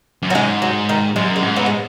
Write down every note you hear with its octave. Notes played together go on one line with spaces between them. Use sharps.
F#2
F#3
G#2 G#3
F#3
D#3
F#2 G#3
G#3
G#2
F#3 B3
G#3